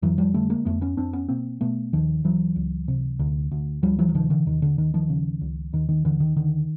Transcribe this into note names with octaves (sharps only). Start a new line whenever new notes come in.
F2 E3 F#3
F3 G3
D3 G3 A3
G#3 A#3
F2 A3 B3
B3 C#4
F2 C4 D4
B3 C#4
B2 A#3 C4
B2 A3 B3
D#2 D#3 F3
D#2 E3 F#3
C#2
C3
D2
D2
D2 F3 G3
E3 F#3
F#3
C3 D#3 F3
D3 E3
D#2 D#3
D3
D#2 D#3
D#3 F3
C#3
C#2
D#2 D#3
D#3
D#2 D3 E3
D#3
D3 D#3